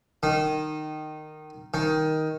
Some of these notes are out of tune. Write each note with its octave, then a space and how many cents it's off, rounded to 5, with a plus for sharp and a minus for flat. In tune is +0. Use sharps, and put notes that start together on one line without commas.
D#3 -15
D#3 +10